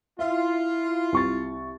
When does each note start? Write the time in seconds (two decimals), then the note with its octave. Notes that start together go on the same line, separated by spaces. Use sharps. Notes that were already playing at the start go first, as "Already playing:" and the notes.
0.19 E4 F4 E5
1.12 C2 C#6 A6